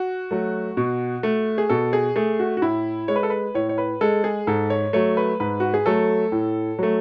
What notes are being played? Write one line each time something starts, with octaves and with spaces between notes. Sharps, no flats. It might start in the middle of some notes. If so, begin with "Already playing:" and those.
Already playing: F#4
F#3 A3
B2
A3
G#4
B2 A4
G#4
A3 G#4
F#4
F#4
A2 E4
G#3 C#5
B4
A4
B4
A2 C#5
C#5
B4
G#3 A4
G#4
G#2 A4
C#5
F#3 A3 C#5
B4
G#2 B4
F#4
G#4
F#3 A3 A4
A2
F#3 A3